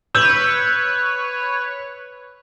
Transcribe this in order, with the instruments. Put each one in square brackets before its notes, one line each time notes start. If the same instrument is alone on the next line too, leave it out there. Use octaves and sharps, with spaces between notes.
[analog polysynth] B4 C#5 [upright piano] E6 G6 E7